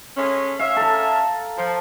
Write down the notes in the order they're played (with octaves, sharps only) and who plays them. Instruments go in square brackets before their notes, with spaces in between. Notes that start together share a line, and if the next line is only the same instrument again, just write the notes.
[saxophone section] G#3 A3 C#4
[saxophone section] C#4 E5 [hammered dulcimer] F5
[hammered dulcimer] A4 A#5
[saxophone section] F3